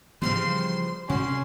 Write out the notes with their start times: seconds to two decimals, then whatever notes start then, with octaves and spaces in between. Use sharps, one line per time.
0.22 C#3 E3 F3 G3 B3 C6
1.10 C3 C#4 F#4 C6